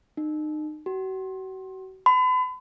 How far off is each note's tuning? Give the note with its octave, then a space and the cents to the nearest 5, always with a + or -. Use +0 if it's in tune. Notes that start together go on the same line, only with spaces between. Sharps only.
D#4 -30
F#4 +40
B5 +40